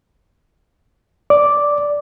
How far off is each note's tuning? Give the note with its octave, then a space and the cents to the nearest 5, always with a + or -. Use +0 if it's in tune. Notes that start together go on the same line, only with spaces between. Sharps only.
D5 -10 D6 -5